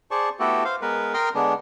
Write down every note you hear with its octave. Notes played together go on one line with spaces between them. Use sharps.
G#4 C5 D5 A5 C#6
A3 B3 E4 F#4 G4 A4
C5 F5
G#3 B3 A#4 B4
A#4 G5 A#5 C6 D#6 F6
D3 G#3 B3 D4